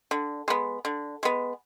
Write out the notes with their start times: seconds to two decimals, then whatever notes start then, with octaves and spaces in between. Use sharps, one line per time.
0.11 D3
0.48 G#3 B3
0.85 D3
1.23 G#3 B3